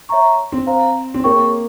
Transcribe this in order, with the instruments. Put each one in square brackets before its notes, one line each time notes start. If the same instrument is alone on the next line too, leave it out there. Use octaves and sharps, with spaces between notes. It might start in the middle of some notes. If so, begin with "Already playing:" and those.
[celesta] C#5 E5 A#5 C#6
[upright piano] C4
[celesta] C5 F5 A#5
[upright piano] C4
[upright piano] A#3 [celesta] G#4 C#5 G5 C#6